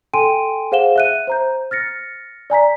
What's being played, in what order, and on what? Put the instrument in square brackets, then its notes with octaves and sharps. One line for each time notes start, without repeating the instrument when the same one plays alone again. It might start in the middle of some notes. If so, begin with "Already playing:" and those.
[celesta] A4 G5 G#5 C6 D7 D#7
G#4 C5 F5 F#5 E7 G7
E5 F#6 D#7
C5 A#5 G6
F6 A6 A#6 C#7
D5 G#5 A#5 B6